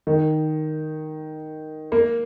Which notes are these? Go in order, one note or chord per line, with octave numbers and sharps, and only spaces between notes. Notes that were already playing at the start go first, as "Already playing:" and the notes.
D#3
A#3